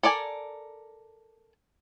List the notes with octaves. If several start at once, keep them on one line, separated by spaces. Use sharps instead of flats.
A4 A#4 D5 G#5